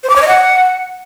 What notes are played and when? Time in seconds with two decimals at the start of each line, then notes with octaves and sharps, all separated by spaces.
0.03 C5
0.09 D6
0.16 C#5
0.22 D#5
0.28 F#5